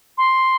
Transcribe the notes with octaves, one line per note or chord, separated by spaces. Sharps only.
C6